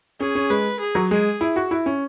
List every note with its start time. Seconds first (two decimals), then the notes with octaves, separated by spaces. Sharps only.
0.20 C#4 G#4
0.35 C#4
0.50 G#3 B4
0.80 G#4
0.95 F#3
1.11 G#3 G#4
1.41 E4
1.56 F#4
1.71 E4
1.86 C#4